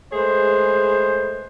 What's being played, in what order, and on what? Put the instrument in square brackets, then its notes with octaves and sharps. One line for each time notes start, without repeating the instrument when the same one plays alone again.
[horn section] G#3 A3 G#4 B4 C5